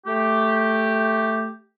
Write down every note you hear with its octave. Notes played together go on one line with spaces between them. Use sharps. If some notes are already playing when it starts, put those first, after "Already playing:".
A3 G4